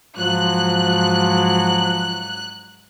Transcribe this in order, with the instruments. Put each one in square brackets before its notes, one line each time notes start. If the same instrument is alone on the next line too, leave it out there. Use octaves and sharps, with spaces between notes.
[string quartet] G#2 F#3 [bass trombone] F3 [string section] F#6